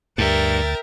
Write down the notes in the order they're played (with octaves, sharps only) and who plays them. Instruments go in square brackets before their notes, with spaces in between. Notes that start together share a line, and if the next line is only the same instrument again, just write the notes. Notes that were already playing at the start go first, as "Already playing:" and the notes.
[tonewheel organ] D2 A6 [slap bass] G2 [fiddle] A#4 [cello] E5 G5